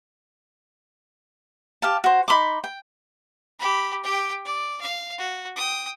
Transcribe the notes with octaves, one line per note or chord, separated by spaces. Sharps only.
G4 F5 A5
F#4 C5
D#4 B5 C6 D6
G5
G4 B5
G4 G5
D5
F5
F#4
G5 D#6